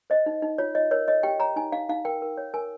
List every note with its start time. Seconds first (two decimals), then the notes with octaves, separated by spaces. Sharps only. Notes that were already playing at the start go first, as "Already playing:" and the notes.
0.10 C5 D#5
0.26 D#4
0.42 D#4
0.58 F4 C#5
0.75 C#5 D#5
0.91 A#4 C#5
1.08 C#5 D#5
1.23 G4 G5
1.40 C#5 A#5
1.56 D#4 G#5
1.72 D#4 F5
1.89 D#4 F5
2.05 A#4 G5
2.22 A#4
2.37 C#5
2.54 A#4 G#5